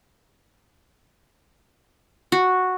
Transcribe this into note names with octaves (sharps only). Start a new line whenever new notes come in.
F#4